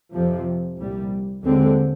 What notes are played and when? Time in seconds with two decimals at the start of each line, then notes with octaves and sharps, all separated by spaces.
0.14 F2 C3 F3
0.78 C2 A#2 G3
1.42 D#2 D3 G#3 C4